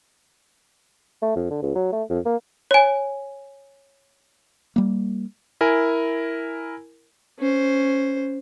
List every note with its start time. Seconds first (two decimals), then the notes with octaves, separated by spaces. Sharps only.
1.22 A3
1.36 F2
1.50 D3
1.62 C#2
1.75 F#3
1.93 A3
2.10 F2
2.25 A#3
2.71 C#5 G#5
4.76 G3 A#3
5.61 E4 A#4 G#5
7.39 C#4 C5